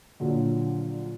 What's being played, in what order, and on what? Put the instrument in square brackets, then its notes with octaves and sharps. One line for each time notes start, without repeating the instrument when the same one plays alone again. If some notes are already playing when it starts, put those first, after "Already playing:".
[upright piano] A#1 A#2 D3 F#3